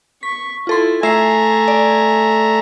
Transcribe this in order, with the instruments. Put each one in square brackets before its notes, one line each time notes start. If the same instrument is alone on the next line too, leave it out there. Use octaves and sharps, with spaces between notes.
[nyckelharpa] C#6 [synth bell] B6
[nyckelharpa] E4 [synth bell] F4 A4 C6
[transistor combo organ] A3 A#5 [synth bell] E5 C7 [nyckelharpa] G#5
[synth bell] D5